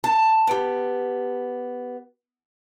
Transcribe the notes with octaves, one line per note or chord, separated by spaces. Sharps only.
A5
B3 G4